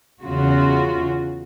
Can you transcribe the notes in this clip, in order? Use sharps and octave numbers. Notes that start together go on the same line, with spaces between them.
E2 C#3 F4 F#4